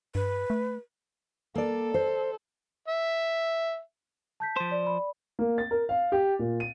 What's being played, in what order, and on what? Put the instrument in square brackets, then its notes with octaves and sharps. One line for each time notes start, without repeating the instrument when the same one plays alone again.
[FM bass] G2 [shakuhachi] B4
[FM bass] A3
[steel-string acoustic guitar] A#3 D5 [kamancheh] A4
[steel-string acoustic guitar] C5
[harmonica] E5
[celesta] A5 G6 B6
[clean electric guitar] F3 C5
[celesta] D5
D5 B5
[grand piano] A#3
A6
A#4
F5
G4
A#2
D#7